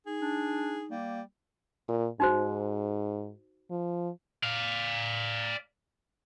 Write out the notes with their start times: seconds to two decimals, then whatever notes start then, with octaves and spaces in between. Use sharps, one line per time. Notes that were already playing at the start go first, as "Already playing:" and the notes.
0.06 D#4 G#4
0.22 D4
0.91 G3 A#3
1.88 A#2
2.20 G#2 D#4 F#4 C5
3.71 F3
4.43 D5 F5